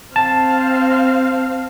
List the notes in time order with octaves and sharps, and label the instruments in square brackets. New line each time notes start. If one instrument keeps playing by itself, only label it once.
[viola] C4 F5 [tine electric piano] A5